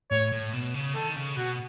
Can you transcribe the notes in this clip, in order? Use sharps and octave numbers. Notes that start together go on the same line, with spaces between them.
A2 C#5
A2
B2
C#3
D#3 A4
C#3
B2 F#4